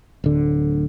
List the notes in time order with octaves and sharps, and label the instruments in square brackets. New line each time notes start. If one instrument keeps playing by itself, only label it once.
[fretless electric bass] D1 D3